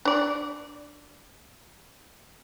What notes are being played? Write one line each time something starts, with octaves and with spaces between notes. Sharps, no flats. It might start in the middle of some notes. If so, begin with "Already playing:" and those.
D4 D5